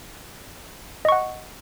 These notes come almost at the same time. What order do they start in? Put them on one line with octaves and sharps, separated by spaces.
D#5 C#6 F#5